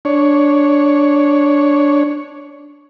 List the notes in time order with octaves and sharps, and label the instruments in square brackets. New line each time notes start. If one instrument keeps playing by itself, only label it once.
[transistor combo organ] D4 C#5